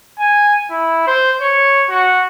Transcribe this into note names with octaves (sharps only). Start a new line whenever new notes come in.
G#5
E4
C5
C#5
F#4